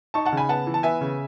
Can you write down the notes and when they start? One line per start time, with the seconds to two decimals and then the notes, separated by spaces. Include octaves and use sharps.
0.14 D#4 A5 C#6
0.25 F#5 A5
0.32 C#3 G#5 B5
0.49 B3 F#5 A5
0.67 E3
0.74 A5
0.83 B3 E5 G#5
1.01 C#3